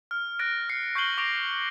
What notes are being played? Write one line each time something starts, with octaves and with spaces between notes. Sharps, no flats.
F6
F6 F#6 A6 A#6 D7
F6 C7 C#7
C#6 G6 A#6 C7 F#7 G7
C#6 D6 A#6 D7 F7